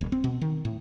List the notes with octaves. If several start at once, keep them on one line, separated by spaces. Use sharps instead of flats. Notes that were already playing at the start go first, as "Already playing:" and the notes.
D#1
C4
B2
D#3
A2